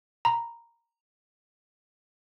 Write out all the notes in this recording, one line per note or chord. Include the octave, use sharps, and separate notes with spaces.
A#5 B5